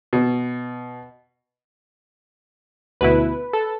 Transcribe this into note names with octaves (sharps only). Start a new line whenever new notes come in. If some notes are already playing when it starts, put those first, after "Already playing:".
B2
D2 B2 E4 B4
A4